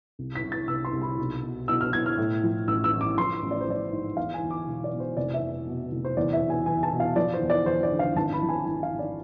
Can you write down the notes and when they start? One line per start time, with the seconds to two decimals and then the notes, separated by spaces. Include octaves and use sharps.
0.19 C2
0.35 B6
0.44 C2
0.52 A6
0.68 C2 E6
0.85 C6
0.93 C2
1.02 B5
1.18 B1
1.43 B2
1.68 B2 E6
1.81 F6
1.93 B2 G#6
2.06 F6
2.18 A2
2.43 F3
2.67 A1 E6
2.84 E6
2.92 A1
3.01 D6
3.18 F3 C6
3.42 A1
3.51 D5
3.61 C5
3.67 F3 D5
3.92 G#2
4.17 E2 F5
4.34 G#5
4.42 E2
4.51 D6
4.67 E1
4.84 D5
4.92 B2
5.00 C5
5.17 F1 D5
5.34 E5
5.41 F1
5.66 B2
5.92 F1
6.05 C5
6.17 E2 D5
6.33 E5
6.41 B2
6.50 G#5
6.66 E2 G#5
6.83 A5
6.92 B2
7.00 F5
7.16 F3 D5
7.34 C5
7.42 E2
7.50 D5
7.66 E2 C5
7.83 D5
7.92 D3
7.99 F5
8.16 G#1 A5
8.33 B5
8.42 F3
8.49 G#5
8.66 G#1 G#5
8.83 F5
8.90 G#2
8.99 D5